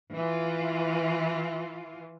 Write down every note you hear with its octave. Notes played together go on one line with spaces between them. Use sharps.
E3 F4